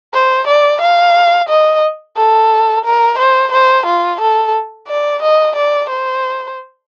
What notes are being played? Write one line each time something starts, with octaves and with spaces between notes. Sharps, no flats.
C5
D5
F5
D#5
A4
A#4
C5
C5
F4
A4
D5
D#5
D5
C5